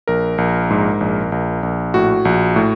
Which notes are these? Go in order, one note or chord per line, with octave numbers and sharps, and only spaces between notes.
A#1 A#4
A#1
G#2
A#1
A#1
A#1
A2 F#4
A#1
A2